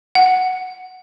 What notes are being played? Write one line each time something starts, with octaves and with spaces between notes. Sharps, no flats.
F#5